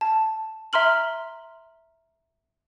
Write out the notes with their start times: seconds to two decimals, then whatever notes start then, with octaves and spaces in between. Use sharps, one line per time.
0.01 A5
0.73 E5 A#5 C6 F6 F#7